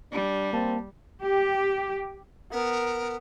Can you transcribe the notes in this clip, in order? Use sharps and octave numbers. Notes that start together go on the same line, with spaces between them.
G3 D4
A#3 C4 A5
G4
B3 A#4